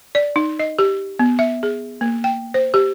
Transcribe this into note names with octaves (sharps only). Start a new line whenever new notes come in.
D5
D#4
D#5
G4
B3
E5
G#4
A#3
G5
C5
G4